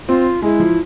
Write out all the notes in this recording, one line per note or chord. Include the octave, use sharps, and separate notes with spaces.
C4 F4
G#3 E4
F3